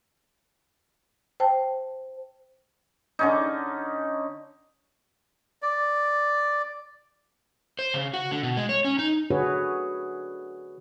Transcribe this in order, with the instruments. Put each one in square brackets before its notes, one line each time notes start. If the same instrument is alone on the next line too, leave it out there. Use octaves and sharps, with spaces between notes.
[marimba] C5 G5 A5
[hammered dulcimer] D3 C#4 D#4
[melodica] D5
[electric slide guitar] C5
C#3
F#4
D3
B2
G#3
C#5
C#4
D#4
[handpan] D3 F#4 G#4 B4 C#5